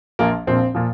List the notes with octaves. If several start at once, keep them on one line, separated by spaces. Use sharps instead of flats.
A#1 A#2 F3 A#3
A#1 A#2 F3 C4
A#2 F3